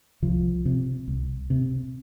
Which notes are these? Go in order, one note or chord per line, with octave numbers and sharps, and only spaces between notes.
C2 F3
C3
C2
C3